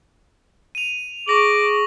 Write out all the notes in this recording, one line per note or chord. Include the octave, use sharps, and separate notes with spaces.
D#7 F7
G#4 C#6 D6 A#6 F#7